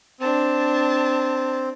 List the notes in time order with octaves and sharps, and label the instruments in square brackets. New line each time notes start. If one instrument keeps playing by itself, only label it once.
[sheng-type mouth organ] C4 [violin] D4 A5